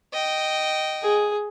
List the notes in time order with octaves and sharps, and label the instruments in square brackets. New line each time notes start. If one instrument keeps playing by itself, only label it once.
[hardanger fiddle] D#5 G5
[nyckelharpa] G#4